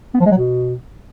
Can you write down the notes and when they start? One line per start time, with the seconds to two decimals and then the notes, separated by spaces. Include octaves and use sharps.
0.14 B3
0.20 F3
0.26 G#3
0.31 F#3
0.37 B2